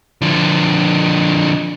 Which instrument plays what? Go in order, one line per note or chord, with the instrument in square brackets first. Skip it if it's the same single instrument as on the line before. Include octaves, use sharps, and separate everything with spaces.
[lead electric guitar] D3 F3